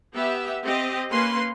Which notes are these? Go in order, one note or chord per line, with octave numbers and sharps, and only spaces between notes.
B3 G4 E5
C4 G4 D#5
A#3 C#4 B4 C6